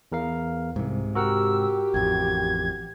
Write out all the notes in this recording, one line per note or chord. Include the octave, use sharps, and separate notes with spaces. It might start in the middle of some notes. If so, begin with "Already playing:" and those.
E2 A#4 F5
C2 G#2 C3
F#4 G4 A#4 F#5 E6
A1 F2 G#6